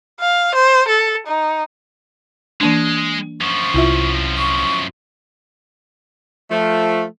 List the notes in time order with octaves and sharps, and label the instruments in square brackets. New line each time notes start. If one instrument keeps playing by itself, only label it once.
[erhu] F5
C5
A4
D#4
[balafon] E3 A#3 D4 [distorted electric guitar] G#3
[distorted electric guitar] F#2 F3 [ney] C#6
[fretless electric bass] C2 [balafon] E4 F4 E5
[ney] C#6
[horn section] F3 A3